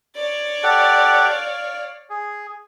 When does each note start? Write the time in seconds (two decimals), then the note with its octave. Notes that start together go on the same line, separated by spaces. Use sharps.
0.16 C#5 D5
0.63 G4 A4 F#5
1.27 F5
2.10 G#4